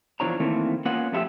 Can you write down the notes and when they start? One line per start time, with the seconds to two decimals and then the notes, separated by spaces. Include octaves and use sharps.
0.20 E2 F3 D4 C#5 A#5
0.40 D#3 E3 A3 A#3 C4
0.85 A#3 B3 C#4 F4 F#5
1.12 F2 A3 E4 G4 E5